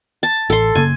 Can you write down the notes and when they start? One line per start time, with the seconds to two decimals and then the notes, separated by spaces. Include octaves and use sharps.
0.23 A5
0.50 A1 A4 C6
0.75 F#1 C#3 A#3 G#5